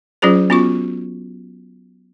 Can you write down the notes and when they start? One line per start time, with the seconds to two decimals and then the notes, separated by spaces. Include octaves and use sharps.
0.22 F#3 C#4 F4 G#4 C5
0.50 B3 C#4 F4 F#4 C#6